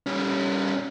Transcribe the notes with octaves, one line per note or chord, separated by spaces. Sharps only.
G3 C#4